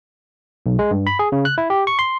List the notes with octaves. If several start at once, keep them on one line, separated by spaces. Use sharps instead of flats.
B1
G#3
G2
B5
G#4
C#3
F#6
E4
G4
C#6
C6